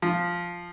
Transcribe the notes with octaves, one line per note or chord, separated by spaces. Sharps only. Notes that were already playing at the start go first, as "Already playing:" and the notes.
F3